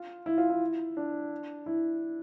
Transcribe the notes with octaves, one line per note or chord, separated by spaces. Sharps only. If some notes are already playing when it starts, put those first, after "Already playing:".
Already playing: F4
E4
F4
E4
D4
E4